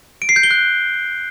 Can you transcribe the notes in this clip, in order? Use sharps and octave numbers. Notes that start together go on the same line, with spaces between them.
D7
C7
G6
G7
F#6